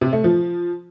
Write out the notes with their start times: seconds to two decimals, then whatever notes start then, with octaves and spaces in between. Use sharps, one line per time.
0.01 C3
0.13 A3
0.24 F3